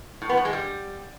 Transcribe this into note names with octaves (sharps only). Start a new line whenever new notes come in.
A2
B3
A2
G#3
G3